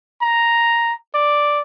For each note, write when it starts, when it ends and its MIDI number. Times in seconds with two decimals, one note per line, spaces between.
0.22 0.94 82
1.15 1.62 74